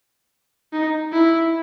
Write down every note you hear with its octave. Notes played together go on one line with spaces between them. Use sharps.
D#4
E4